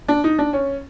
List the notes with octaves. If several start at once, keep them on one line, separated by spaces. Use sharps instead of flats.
D4
D#4
D4
C#4